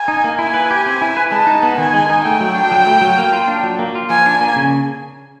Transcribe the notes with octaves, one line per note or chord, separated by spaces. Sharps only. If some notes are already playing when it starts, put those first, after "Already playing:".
Already playing: G#5
D#4
A#3
E4 G#5
B4
G4
C4
E4
B4
G#3 A5
D#4
B3
D#3 G#5
G#3
D#4
A3 G5
F#3
D4
F#3
A3
F#3
A#3
F4
D4
F#3
A#3
F4
F3 G#5
D4
A#3
C#3